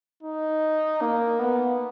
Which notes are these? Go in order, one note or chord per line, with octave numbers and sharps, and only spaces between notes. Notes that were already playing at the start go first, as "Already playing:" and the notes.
D#4
A#3
B3